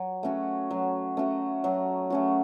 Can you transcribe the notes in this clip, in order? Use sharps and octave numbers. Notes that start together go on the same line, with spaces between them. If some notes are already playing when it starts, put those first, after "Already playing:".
Already playing: F#3
A3 C#4 F#4
F#3
A3 C#4 F#4
F#3
A3 C#4 F#4